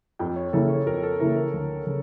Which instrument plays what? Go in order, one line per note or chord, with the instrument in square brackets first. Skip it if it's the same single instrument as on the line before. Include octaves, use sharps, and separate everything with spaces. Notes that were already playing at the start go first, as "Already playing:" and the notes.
[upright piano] F2 [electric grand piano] G5
[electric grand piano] C#5
[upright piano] C#3 E3 A#3 E4 [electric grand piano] A4
[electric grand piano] C#5
[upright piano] F2 [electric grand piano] A#4
[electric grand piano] A4
[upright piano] C#3 E3 A#3 E4 [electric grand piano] A#4
[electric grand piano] A#4
[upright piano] D2
C#3